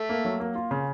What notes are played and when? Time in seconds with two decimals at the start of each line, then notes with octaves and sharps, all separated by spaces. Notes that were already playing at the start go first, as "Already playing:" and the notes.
Already playing: A3
0.09 A#3
0.25 F#3
0.40 A#3
0.55 F4
0.71 C#3